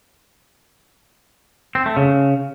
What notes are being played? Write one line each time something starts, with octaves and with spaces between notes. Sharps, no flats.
C4
A3
C#3